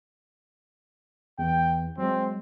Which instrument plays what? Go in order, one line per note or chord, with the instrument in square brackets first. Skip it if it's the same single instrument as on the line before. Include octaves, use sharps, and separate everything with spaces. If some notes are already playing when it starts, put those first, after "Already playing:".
[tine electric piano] E2 [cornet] G5
[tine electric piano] F#3 G#3 [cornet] C4